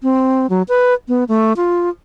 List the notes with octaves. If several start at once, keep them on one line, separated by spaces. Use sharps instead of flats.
C4
F#3
B4
B3
A3
F4